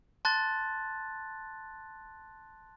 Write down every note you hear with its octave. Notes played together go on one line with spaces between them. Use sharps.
A5 C6 F#6 A6